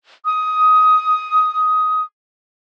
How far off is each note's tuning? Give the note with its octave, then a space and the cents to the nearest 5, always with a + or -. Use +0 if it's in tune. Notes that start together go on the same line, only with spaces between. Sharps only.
D#6 +15